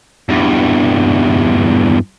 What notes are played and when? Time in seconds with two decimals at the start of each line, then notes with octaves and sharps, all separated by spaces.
0.29 E2 G2